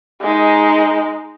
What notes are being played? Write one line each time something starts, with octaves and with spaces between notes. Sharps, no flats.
G#3 D#4